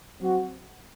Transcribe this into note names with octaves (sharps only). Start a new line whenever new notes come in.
F#3 C4 F#4